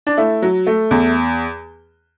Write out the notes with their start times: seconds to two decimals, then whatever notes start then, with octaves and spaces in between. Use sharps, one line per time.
0.07 D4
0.17 A3 E4
0.42 F#3
0.67 A3
0.91 E2